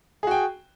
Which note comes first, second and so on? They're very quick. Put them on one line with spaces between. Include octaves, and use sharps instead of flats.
G#4 F#4 G5